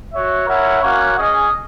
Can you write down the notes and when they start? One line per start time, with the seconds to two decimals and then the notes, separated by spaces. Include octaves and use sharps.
0.12 F#4 C#5 E5
0.47 E4 A#4 C#5 F#5
0.82 A#3 C#4 F#4 C#5 F#5
1.17 C#4 G#4 D#5